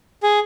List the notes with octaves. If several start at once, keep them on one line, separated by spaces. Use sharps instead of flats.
G#4